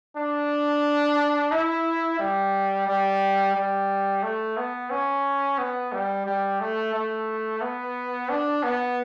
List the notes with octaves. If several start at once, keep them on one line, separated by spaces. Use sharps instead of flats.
D4
E4
G3
G3
G3
A3
B3
C#4
B3
G3
G3
A3
A3
B3
D4
B3